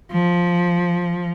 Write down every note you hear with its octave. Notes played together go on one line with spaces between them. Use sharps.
F3